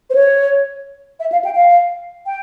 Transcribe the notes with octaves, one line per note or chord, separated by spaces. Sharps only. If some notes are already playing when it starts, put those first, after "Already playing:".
C5
C#5
E5
F5
G5
F5
G5